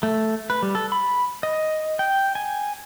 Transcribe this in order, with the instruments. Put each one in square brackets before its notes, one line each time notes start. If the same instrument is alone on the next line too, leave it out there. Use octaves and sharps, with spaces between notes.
[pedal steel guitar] A3
B4
G3
A4
B5
D#5
G5
G#5